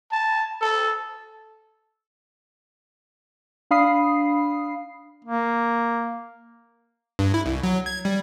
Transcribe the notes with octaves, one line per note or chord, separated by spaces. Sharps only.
A5
A4
D4 F5 B5 D#6 C7
A#3
G2
E4
C2
F#3
G#6
G3